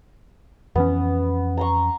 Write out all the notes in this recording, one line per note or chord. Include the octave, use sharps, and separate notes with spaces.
F2 E3 B3 C#4
A#5 C6 C#6